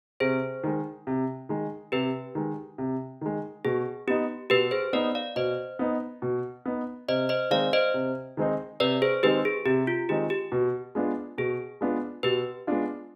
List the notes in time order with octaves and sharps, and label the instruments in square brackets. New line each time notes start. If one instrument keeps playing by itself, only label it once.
[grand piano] C3 [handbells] G#4 C5
[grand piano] D#3 G#3
C3
D#3 G#3
[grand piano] C3 [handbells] G4 B4
[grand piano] D#3 G#3
C3
D#3 G#3
[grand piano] B2 [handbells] G#4
[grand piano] B3 D#4 [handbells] G4
[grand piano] B2 [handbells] G4 B4
[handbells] G#4 C5
[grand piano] B3 D#4 [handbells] B4 D5
[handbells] D5 F5
[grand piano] B2 [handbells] C5 D#5
[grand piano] B3 D#4
B2
B3 D#4
[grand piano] C3 [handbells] C5 D#5
[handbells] C5 D#5
[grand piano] D#3 G#3 C4 D#4 [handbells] D5 F5
[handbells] C5 D#5
[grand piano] C3
D#3 G#3 C4 D#4
[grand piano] C3 [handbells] B4 D5
[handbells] G#4 C5
[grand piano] D#3 G#3 C4 D#4 [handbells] G4 B4
[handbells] G#4
[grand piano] C3 [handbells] G4
[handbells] F4
[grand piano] D#3 G#3 C4 D#4 [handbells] G4
[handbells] G4
[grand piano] B2
G#3 B3 D4 F4
[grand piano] B2 [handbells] G#4
[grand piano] G#3 B3 D4 F4
[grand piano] B2 [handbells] G4 B4
[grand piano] G#3 B3 D4 F4